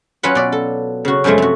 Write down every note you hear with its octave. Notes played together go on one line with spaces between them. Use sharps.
F#3 C#4 F4 B4 F#5
B2 D5
A4
C#3 F#4
F#2 B2 F3 G#3 A3
C3 F#4